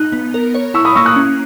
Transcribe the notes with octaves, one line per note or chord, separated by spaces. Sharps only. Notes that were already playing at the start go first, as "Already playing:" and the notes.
Already playing: D#4 F#6
B3
A#4
C#5
E4 C#6 E6
B5 D#6
A#3 C#6 E6
D#6 F#6
C#4